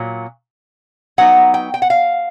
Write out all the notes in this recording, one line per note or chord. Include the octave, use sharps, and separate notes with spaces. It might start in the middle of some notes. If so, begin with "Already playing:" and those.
Already playing: A#2 F#3
F#3 B3 D#4 F#5
G5
G5
F#5
F5